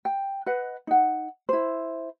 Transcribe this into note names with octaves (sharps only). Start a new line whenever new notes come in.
G5
B4 D#5 F#5
D#4 F#5
E4 C5